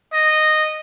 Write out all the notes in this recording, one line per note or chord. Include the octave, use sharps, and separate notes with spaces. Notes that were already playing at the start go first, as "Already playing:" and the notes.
D#5